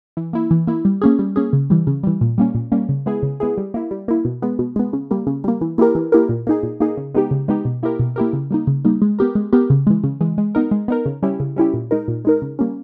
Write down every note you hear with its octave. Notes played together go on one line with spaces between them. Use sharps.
E3
A#3 E4
E3
A#3 E4
G3
A#3 C#4 G#4
G3
A#3 C#4 G#4
C#3
E3 G3
C#3
E3 G3
A#2
G3 A#3 C#4
A#2
G3 A#3 C#4
C#3
G#3 B3 E4 G#4
C#3
G#3 B3 E4 G#4
G3
A#3 E4
G3
A#3 E4
B2
G#3 B3
B2
G#3 B3
C#3
G3 A#3
C#3
G3 A#3
E3
A#3 E4 G4 A#4
E3
A#3 E4 G4 A#4
A#2
A#3 D#4 G#4
A#2
A#3 D#4 G#4
C#3
G#3 B3 D#4 G4
C#3
G#3 B3 D#4 G4
B2
A#3 E4 G4 A#4
B2
A#3 E4 G4 A#4
C#3
G3 A#3 D#4
C#3
G3 A#3 D#4
G#3
B3 G4 A#4
G#3
B3 G4 A#4
C#3
E3 G#3
C#3
E3 G#3
G#3
B3 D#4 A#4
G#3
B3 D#4 A#4
C#3
G3 C#4 E4 G4
C#3
G3 C#4 E4 G4
A#2
G#3 D#4 A#4
A#2
G#3 D#4 A#4
C#3
G3 A#3 C#4